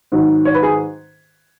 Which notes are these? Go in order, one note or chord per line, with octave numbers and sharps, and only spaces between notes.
G#2 D#3 F#3
C#5
B4
G#4